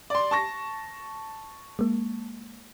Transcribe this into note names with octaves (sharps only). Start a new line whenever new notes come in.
D5 C6
A5 C#6 A#6
G#3 A#3